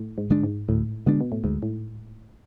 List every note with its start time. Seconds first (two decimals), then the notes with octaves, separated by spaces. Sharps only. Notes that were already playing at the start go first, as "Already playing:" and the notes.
Already playing: A2
0.18 G#2
0.30 D3 G#3 D4
0.43 G#2
0.68 D2 A2
1.06 B2 D3 G#3 D4
1.21 B2
1.32 A2
1.44 D2 G#2
1.62 A2